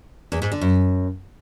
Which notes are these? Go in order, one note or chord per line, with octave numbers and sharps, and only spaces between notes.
E2
G#2
D3
F#2